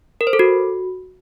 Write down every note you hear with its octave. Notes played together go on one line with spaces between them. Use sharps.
A#4
C5
A4
F#4